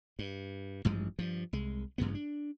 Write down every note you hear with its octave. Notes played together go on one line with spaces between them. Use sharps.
G2
A1 G2 F3 G#3
G2 F3
C2 G#3
A1 G2 C#3 B3
D4